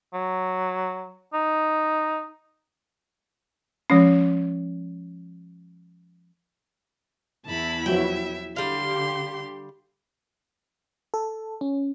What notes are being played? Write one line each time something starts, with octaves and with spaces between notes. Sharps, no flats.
F#3
D#4
F3 G#3 C#4
E2 E4 A5 B5
F3 F#3 B3 E5 G5
D3 G3 G4 F5 C6
A4
C#4